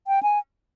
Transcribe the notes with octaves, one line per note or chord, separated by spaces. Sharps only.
G5
G#5